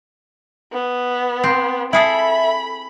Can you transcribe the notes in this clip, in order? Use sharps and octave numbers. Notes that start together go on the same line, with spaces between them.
B3
C4
E4 G#4 A4 E5 B5